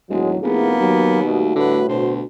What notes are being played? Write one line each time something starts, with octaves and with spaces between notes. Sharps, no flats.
E1 D#2 A2 F#3 G#3
F1 A#3 B3 E4 G#4
D#2 F#3
B2 G3 A3 F#4
A2 D3 B4
D2 B2 C5